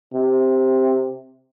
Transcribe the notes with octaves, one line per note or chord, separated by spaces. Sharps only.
C3